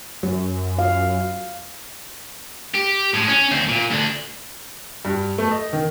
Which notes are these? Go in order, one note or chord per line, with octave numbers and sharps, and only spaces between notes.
F#2
F5
G4
A2 G#3
C#4
D2 C4
A#2
D2 D4
G2
A3
D#5
D#3